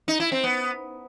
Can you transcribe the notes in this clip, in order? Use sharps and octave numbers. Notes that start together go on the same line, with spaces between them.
D#4
E4
C4
B3